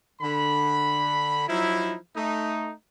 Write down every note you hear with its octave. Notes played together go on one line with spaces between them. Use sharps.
D3 B5
F3 F#3 D#4 E4
A3 D#4